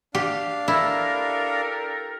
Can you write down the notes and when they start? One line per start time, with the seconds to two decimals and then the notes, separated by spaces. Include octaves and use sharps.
0.15 D4 G4 F5
0.68 E4 G4 A4 A#4